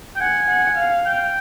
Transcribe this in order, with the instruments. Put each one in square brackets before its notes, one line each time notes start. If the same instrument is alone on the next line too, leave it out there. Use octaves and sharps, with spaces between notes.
[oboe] G5
[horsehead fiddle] F#5 [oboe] G#5
[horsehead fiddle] F#5
F5
[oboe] G5